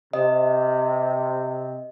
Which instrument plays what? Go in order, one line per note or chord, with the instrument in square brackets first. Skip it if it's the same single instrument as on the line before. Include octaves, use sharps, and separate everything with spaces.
[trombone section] C3 [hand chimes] D#5